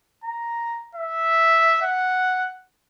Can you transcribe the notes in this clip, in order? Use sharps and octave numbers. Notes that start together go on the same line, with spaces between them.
A#5
E5
F#5